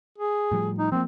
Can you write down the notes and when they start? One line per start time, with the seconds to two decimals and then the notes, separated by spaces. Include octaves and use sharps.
0.19 G#4
0.52 A2 F3 G3
0.79 D#4
0.92 F3 A#3 C4